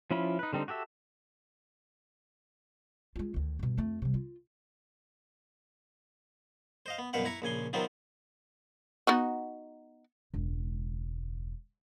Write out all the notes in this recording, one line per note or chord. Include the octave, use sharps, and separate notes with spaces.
F3 C#4 E4 F4 B5
D#4 B4
D3 G3 C4 D#4
F#4 G4 A4 E5
G#3 F4
D2 D#3
G2 B2
F2 A3
C3 G3
F4
C5 D#5 F5
B3
C2 F#2 B2 B4 F5 F#5
E4 B4 A#5 C#6
A#1 C#3 G#5 C6
C3 D#3 F#3 B3 C4 F4
B3 D#4 F#4
E1 C#2